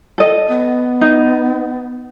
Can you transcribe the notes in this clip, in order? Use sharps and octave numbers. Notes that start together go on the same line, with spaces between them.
A4 D#5
B3
D#4